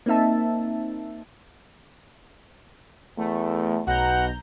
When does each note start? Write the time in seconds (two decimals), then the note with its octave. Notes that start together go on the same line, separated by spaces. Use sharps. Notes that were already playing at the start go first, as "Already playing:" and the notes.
0.06 A#3 C4 D#4 E5 A5
3.18 E2 A3
3.87 B1 B2 F#5 A#5 G6